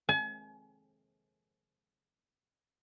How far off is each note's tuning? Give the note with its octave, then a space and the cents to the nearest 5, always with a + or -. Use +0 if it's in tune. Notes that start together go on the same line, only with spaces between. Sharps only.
G#5 +40